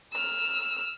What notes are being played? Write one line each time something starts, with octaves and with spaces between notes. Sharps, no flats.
E6 F6